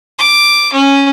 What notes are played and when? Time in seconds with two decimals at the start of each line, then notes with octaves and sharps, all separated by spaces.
0.19 D6
0.73 C#4